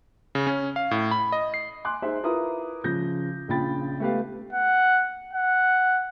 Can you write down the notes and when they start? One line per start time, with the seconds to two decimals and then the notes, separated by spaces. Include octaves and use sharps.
0.35 C#3
0.47 C#4
0.76 F5
0.91 A2
1.11 B5
1.32 D#5
1.54 C7
1.84 G#5 C6 D6 F#6
2.02 D#4 G#4 C5 E5
2.23 E4 F4 A#4 B4 D#6
2.84 C#3 F3 G6 A#6
3.48 A#1 C#3 F4 G5 B5 A6
4.00 A3 B3 G4 B4 F5
4.53 F#5
5.33 F#5